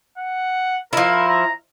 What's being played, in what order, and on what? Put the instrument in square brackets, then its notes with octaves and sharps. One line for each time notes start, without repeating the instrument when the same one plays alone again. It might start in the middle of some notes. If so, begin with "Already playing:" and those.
[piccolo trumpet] F#5
[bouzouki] F3 E4 [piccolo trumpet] A#4
[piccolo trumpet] A#5